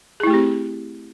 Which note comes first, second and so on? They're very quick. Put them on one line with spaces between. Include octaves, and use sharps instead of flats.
G#4 E4 A3 G4 C4